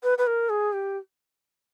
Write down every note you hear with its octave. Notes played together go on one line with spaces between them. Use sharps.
B4
B4
A#4
G#4
G4